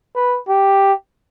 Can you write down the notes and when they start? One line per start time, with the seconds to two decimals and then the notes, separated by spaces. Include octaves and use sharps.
0.15 B4
0.48 G4